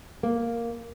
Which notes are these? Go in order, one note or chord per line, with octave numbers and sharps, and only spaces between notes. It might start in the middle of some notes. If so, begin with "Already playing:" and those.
A#3